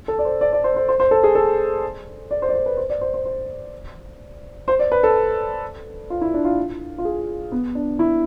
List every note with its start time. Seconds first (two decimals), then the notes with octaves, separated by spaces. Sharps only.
0.08 A4
0.19 D5
0.25 C5
0.41 D5
0.53 D5
0.64 C5
0.76 C5
0.88 C5
1.00 C5
1.11 A4
1.24 G#4
1.35 A4
2.31 D5
2.42 C5
2.49 D5
2.54 C5
2.66 B4
2.77 C5
2.90 D5
3.01 C5
3.14 C5
3.25 C5
4.68 C5
4.79 D5
4.92 B4
5.03 A4
6.10 F4
6.21 E4
6.34 D4
6.45 F4
6.98 F4
7.05 G#4
7.52 B3
7.75 D4
7.99 E4